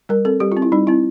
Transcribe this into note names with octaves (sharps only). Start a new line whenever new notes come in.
G3 A#4
C4 A4
G3 G4
F4
C4
E4
G3 D#4
C4 E4